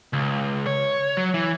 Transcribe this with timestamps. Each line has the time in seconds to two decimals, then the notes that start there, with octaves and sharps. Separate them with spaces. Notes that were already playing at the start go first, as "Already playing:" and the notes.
0.13 C#2
0.67 C#5
1.17 F#3
1.34 E3